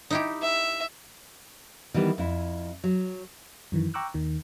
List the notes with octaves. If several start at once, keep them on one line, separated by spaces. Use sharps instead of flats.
D#4 E4 G4
E5
D#3 E3 G3 B3
F2 E4
F#3
F#2 D#3 E3
G5 A#5 C#6 D6 E6 F#6
D#2 D#3